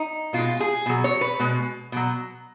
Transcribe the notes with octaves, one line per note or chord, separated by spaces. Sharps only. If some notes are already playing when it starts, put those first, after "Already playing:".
Already playing: D#4
B2 G#3 F4
G#4
B2 F#3
C#5
B4
B2 G#3
B2 F#3